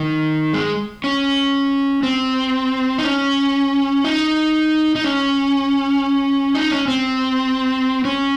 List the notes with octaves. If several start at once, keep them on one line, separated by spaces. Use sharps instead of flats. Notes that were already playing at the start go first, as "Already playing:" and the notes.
Already playing: D#3
G#3
C#4
C4
D#4
C#4
D#4
D#4
C#4
D#4
C#4
C4
C#4